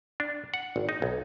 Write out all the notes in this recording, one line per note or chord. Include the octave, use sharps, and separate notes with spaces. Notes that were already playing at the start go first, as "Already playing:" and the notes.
D4
F#5
G#1
D#4
B1